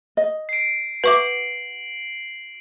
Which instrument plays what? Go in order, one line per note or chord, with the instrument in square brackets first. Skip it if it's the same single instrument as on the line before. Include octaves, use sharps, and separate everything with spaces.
[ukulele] D#5
[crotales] C7 D7
[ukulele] F#4 E5 [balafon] B4 C#6 D6 [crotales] F#7